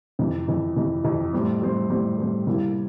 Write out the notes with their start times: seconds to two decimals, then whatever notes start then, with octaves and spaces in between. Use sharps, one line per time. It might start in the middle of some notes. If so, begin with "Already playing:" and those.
0.19 F2 C3 E3
0.48 F2 C3 E3
0.76 F2 C3 E3
1.04 F2 C3 E3
1.33 A2 G3 C4
1.62 A2 G3 C4
1.90 A2 G3 C4
2.18 A2 G3 C4
2.47 C3 G3 A#3 E4